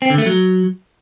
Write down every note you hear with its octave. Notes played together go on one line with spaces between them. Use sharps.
C4
D3
A3
F#3